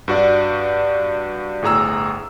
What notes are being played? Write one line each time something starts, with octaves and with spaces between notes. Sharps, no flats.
G2 F#4 D5
G1 A2 G#4 A#5 E6